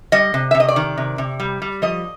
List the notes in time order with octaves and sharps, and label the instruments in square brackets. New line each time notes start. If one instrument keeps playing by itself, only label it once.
[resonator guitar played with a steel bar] G3 D#5
C3
E5
C3
D#5
D5
D#3
C3
C3
G3
G3
F3 D#5